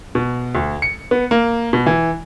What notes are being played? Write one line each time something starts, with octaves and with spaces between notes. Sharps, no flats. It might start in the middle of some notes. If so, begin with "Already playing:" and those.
B2
D2
C#7
B3
A#3
B2
E3